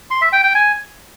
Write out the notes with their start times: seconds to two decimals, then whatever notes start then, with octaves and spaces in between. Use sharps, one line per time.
0.10 C6
0.22 E5
0.33 G5
0.44 G5
0.55 G#5